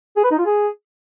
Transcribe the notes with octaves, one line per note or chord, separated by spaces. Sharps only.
G#4
B4
D#4
F4
G#4